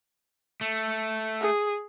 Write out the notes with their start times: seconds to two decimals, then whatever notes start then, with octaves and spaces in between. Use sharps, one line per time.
0.61 A3
1.40 G#4